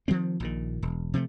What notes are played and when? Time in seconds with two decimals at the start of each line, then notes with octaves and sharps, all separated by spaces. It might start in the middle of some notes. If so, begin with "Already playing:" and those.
0.08 D#3 F3 G#3 C4
0.40 A#1 A#2 D#3
0.83 E1
1.14 C3 F3 G3 A3